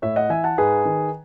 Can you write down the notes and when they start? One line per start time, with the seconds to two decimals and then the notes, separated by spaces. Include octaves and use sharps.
0.02 A2 C#5 E5
0.16 D#5 F#5
0.30 E3 E5 G#5
0.44 F#5 A5
0.58 G#2 G#4 B4
0.85 D#3